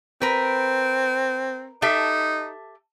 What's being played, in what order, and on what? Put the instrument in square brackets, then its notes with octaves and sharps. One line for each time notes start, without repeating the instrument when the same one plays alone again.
[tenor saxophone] C4 [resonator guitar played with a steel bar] A#4 B4
[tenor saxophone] D#4 [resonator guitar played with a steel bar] G4 A4 E5